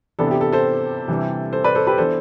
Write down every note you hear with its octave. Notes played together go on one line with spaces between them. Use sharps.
C3 E3 B3 D4 A4
G4
A4
A4 C5
C3 E3 G3 D4
A4 C5
B4 D5
A4 C5
G4 B4
E3 B3 D4 A4 C5